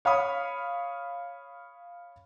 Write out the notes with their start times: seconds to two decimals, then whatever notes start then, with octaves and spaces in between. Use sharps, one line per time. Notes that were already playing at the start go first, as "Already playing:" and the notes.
0.05 C#5 F5 B5 D#6